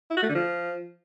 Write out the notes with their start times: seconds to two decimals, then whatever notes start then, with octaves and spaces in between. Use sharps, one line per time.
0.10 E4
0.17 F#4
0.23 A3
0.29 D3
0.35 F3